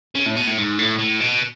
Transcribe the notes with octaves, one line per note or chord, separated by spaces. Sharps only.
C#3
A2
B2
A2
G#2
A2
A2
B2